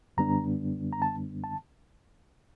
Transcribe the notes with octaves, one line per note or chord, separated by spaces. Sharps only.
F#2 D3 G3 B3 D4 A#5
A#5
A5
A5